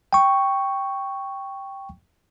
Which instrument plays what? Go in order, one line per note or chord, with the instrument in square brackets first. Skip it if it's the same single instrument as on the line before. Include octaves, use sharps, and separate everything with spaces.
[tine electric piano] G5 C#6